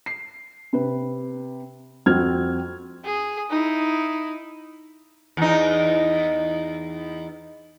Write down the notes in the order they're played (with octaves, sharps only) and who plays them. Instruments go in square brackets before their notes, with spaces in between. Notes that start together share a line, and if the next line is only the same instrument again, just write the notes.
[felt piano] C7
C3 B4
F2 C4 F#4 F6 G#6
[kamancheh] G#4
D#4 E4
[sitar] E2 D#4